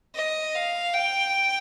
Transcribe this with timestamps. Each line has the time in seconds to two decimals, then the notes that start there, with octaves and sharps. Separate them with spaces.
0.15 D#5
0.55 F5
0.94 G5